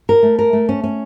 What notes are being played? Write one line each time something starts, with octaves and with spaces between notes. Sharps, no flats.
A#4
A3
A#4
A3
C#4
C#4